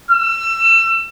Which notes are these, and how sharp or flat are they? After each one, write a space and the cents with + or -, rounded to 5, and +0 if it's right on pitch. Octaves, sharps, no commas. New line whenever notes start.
E6 +30